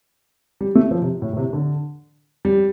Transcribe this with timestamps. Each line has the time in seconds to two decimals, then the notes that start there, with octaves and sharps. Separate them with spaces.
0.61 G3
0.75 A3
0.91 F3
1.01 C3
1.22 A2
1.33 A2
1.37 C3
1.53 D3
2.45 G3